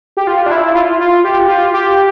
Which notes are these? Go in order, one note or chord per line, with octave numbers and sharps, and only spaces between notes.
G4
F4
D4
E4
F4
F4
G4
F4
G4